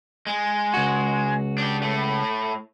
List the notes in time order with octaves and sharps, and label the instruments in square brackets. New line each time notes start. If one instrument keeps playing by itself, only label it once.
[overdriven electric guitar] G#3
[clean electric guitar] C#2 F#4
[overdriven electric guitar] D4 G4
A2 A3